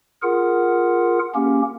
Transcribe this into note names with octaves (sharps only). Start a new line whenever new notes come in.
F4 G#4 A#4 F#5
A#3 C#4 G4